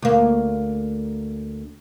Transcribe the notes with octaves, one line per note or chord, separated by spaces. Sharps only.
D2 A#3